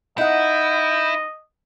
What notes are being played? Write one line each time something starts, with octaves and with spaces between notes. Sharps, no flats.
D#4 E4 D#5 F#5 G6